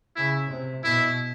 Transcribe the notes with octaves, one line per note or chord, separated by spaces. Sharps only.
C#3 E4
C3
B2 E4